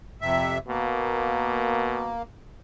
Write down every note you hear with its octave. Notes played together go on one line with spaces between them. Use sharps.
F2 C3 E5
B2 A#3